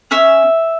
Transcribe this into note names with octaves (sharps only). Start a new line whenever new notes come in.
C#4 E5